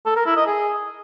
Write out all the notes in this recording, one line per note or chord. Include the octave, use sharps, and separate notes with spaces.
A4
A#4
E4
D#5
G#4